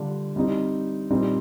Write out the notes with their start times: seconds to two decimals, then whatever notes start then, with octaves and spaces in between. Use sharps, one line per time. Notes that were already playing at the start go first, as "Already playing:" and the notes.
Already playing: D3 G3 D4 F4
0.36 G3 C4 D#4
1.10 A#2 G3 C4 D#4